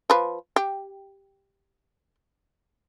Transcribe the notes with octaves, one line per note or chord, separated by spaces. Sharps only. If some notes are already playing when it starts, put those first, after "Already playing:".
F3 B4
G4